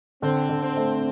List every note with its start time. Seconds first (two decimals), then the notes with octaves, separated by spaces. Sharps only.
0.22 D3 C4
0.49 D3
0.62 C4
0.77 A3